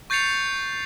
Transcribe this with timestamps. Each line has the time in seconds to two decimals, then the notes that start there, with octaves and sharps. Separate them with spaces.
0.10 C#6 G6 A6 C7 C#7 F7